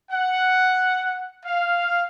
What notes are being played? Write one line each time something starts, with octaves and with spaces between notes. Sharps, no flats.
F#5
F5